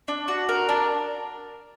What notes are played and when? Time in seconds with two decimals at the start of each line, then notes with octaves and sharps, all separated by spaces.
0.08 D4
0.28 F#4
0.49 A#4
0.69 D4